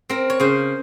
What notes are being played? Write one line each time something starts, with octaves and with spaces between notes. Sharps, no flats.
C4 A#4
C#5
C#3 C5